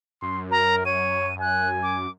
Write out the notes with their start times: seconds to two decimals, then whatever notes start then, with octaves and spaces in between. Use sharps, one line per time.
0.22 F#2 C6
0.51 A#4 A#5
0.86 C#5 D#7
1.41 G#5 F#6
1.83 D6